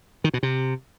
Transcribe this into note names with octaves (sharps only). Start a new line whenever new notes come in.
D#3
B2
C3